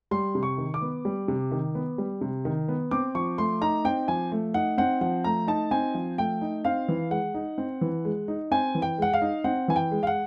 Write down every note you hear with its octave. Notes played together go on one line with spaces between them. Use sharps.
G3 C6
C3
C#6
D#3
D6
B3
G3
C3
D#3
B3
G3
C3
D#3
B3
C4 D6
F3 C#6
A3 C6
D#4 A#5
C4 G5
F3 G#5
A3
D#4 F#5
C4 F#5
F3 F#5
A3 A#5
D#4 A5
C4 G#5
F3
A3 G5
D#4
C4 F5
E3
G#3 F#5
D#4
C4
E3
G#3
D#4
C4 G#5
E3
G5
G#3 F#5
F5
D#4
C4 F#5
E3 G#5
G5
G#3
F5
F#5